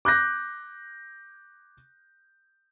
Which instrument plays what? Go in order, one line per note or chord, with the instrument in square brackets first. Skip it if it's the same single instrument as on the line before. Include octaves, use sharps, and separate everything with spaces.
[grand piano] D6 F#6 G6 A#6